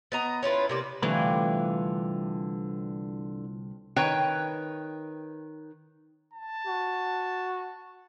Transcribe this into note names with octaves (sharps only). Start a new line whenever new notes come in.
B3 D#5 A#5
C#4 E4 F4 B4
C3 A#3 D5
C2 D3 E3 A3 C4 D4 F4 B5
D#3 B4 C#5 G5
A5
F#4